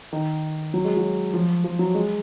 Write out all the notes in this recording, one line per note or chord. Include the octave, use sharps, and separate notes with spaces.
D#3
F#3
G#3
F#3
F3
F3
F#3
G#3